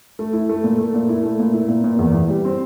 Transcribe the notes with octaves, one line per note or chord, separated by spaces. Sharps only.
A3
E4
A3
A#2
A3
A#2
E4
A3
A#2
E4
A#2
A#2
E2
E3
G3
C4